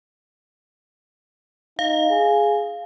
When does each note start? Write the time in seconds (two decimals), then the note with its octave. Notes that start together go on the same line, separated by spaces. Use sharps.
1.79 D#4 F5
2.10 G#4